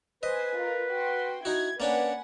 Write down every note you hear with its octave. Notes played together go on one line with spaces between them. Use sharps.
B4 C5 D#5 G#5
F4 A#4
F#4 G5 C6
D#4 E4 F#4 G#6
A#3 C#4 D4 B4 D5 F#5 G#5